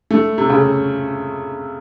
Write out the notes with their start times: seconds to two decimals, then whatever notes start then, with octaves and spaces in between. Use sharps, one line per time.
0.11 A3
0.38 C3
0.50 C#3